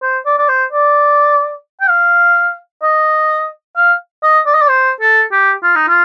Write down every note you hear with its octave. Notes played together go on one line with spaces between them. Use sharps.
C5
D5
D5
C5
D5
G5
F5
D#5
F5
D#5
D5
D#5
D5
C5
A4
G4
F4
D#4
F4